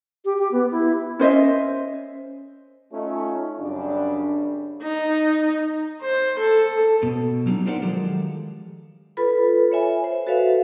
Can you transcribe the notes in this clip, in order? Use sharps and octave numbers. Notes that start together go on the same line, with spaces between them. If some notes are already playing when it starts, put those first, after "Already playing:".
G4
G4
B3
E4
C#4 C5 D#5 E5
A3 C#4 D#4 F4
F#2 C#3 G3 C4 D4
D#4
C5
A4
B2
F#3 G3 A#3 C4 D4 D#4
F4 G4 A#4 C5 D5 F#5
D#3 F3 F#3 G#3 G4 A4
F4 A4 B4 B5
C#5 E5 G#5 B5
C5
F#4 A4 B4 C#5 E5 F5